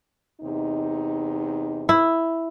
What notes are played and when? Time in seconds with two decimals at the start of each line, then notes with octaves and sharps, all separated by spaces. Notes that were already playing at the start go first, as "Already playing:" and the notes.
0.41 E2 C3 D#4
1.89 E4